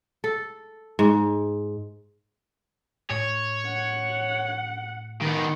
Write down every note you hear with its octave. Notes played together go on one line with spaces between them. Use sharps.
A4
G#2
A2 C#5
F#5
D#3 B3